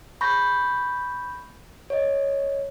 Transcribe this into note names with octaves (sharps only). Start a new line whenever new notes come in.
B5 C#6 G6 A#6
C#5 D#5